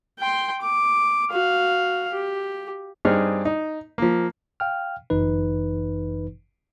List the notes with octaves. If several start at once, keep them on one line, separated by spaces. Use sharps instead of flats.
G5 C6
D6
F#4 F5
G4
G2 C4 D#4 G#4 F6
D#4
F3 A#3
F5 G5 F6
G1 F#2 E3 D#4 B4